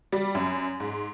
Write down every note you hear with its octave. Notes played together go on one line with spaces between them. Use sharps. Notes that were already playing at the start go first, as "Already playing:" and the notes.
G3
F#2
G#2